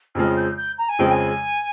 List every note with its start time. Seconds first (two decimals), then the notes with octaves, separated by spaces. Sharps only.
0.15 F2 C#3 F3 G#3 F6
0.37 G6
0.57 G6
0.78 A#5
0.89 G#5
0.99 F2 C#3 F3 G#3 G5
1.11 G#5